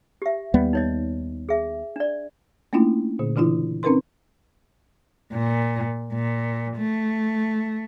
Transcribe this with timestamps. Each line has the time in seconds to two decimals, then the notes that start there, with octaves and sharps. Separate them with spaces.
0.22 G4 E5
0.54 D#2 G3 B3
0.73 D#4 C#5 D#5
1.49 G#4 E5
1.96 D4 D5
2.73 A3 A#3 C#4 D4 E4 F4
3.19 A#2 D3
3.36 C#3 E3 D4 E4 F4
3.83 C4 C#4 D#4 A#4 B4 C6
5.33 A#2
6.13 A#2
6.77 A3